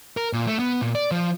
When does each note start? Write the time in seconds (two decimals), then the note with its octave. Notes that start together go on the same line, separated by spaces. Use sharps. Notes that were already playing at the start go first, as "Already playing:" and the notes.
0.17 A#4
0.33 A#2
0.47 A3
0.59 B3
0.81 A#2
0.95 D5
1.11 F3